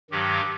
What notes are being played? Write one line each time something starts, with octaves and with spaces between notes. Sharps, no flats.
G2 D#3 F#3 G4